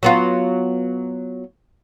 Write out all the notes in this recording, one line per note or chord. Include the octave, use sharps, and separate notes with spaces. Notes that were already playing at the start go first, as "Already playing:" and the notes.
F#3 B3 F4